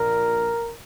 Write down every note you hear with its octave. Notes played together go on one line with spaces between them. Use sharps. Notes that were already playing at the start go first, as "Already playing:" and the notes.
Already playing: A#1 A#2 A#4